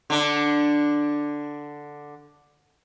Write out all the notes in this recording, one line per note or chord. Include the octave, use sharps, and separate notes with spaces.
D3 D4